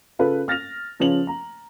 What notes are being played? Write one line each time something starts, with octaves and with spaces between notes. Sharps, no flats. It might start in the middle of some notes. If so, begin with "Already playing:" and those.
C#3 F4 A4 B4
F6 A6 A#6 F7
C#3 F3 C#4 B4 F7 F#7
A#5